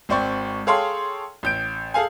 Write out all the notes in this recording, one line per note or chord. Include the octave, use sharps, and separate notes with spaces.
G#1 C4 D5 C#6
G#4 A4 C#5 F5 G5 C6
A1 G6 D7
G#4 A4 F5 G#5